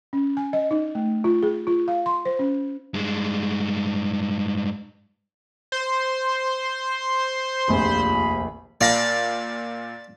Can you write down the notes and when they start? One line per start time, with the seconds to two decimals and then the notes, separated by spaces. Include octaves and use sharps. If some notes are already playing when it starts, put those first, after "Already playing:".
0.13 C#4
0.37 G#5
0.53 D#5
0.71 D#4
0.95 A3
1.24 F4
1.43 G#4
1.67 F4
1.88 F5
2.06 C6
2.25 C5
2.39 C#4
2.94 G2 G#3
5.72 C5 C6
7.68 F1 A#1 D#2 F4 G#4 B5
8.81 A#2 D5 F5 A5 B5 A#6